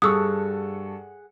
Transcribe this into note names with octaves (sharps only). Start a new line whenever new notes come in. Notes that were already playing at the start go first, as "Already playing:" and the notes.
G2 G#4 A4 F#5 C#6 D#6 E6